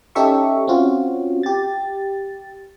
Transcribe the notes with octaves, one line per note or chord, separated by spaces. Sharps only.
C#4 D#4 G4 A4 E5 C#6
C4 C#4 F4 F#4
G4 A6